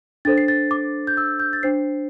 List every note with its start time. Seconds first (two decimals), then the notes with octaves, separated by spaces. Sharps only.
0.25 D4 A4 C5 A6
0.38 C7
0.48 A6
0.71 D6
1.07 G6
1.17 E6
1.40 G6
1.53 A6
1.63 D4 C5 C7